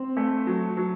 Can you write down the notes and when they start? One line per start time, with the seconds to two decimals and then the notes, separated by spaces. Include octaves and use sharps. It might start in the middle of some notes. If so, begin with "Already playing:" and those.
Already playing: C4
0.17 A3
0.47 F#3
0.77 F#3